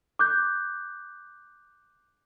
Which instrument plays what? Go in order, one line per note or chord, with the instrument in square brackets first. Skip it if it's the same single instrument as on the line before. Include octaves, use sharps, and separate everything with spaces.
[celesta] D6 F#6 G6